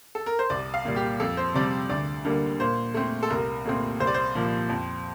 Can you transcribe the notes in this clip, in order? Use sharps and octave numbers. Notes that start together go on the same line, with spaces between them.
A4
A#4
C5
C2 D5
F5
A#2 G3
G4
F2 A4
C5
C3 G3 C4 D5
D2 D5
D3 G3 A#3
A#2 C5
A3 C4
A4
C2 A#4
A#2 A3 C4
C2 C5
D5
C5
A#2 F3
F2